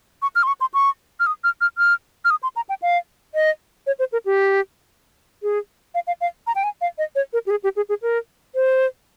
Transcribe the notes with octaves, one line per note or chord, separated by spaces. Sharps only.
C#6
F6
C6
C#6
C6
C#6
F6
D#6
F6
F6
F6
F6
D#6
C6
A#5
G5
F5
D#5
C#5
C5
A#4
G4
G#4
F5
F5
F5
A#5
G5
G#5
F5
D#5
C#5
A#4
G4
G#4
G4
G#4
G#4
A#4
C5